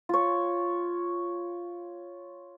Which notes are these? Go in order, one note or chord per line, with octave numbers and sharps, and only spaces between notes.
F4 C#5